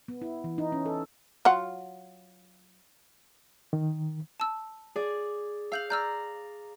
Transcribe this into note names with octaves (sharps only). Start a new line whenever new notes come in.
B3
E4
E3
D#4
C#4
A4
F#3 F4 F#5
D#3
A5 E6
G#4 D5
F5 E6 G6 F#7
D5 A#5 E6 F6 G6